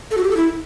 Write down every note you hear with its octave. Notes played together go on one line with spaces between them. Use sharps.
A4
F#4
G4
A4
E4